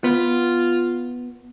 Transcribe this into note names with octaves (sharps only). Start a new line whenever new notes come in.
B3 F4